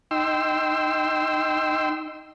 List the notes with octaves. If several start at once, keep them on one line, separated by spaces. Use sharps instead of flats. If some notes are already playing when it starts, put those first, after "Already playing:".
D#4 G5 C6 E6